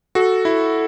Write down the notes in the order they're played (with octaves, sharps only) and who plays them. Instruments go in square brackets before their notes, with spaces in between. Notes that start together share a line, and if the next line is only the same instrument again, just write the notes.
[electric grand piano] F#4 [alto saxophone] A4
[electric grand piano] E4